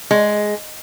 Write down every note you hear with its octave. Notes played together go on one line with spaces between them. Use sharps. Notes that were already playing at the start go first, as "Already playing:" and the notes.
G#3